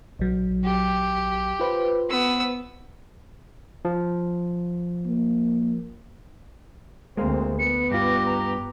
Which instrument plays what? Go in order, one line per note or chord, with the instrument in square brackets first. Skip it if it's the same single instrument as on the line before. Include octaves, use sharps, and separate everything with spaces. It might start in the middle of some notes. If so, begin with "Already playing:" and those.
[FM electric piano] A#1 F#3
[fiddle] G4
[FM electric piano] F4 B4 C5
[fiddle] B3 E6
[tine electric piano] F3
[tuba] A#3
[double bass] D2 C4 [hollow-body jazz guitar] G#3 A#3
[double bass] B3 [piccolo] C#7
[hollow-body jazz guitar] G2 F4 [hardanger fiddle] G4 [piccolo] A#6
[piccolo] A#5